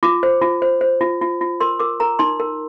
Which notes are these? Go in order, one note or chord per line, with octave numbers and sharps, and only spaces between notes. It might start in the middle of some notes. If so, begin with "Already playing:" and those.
F4 D6
C5
F4
C5
C5
F4
F4
F4
A#4 C6
A#4 D6
A#4 A#5
D#4 C6
A#4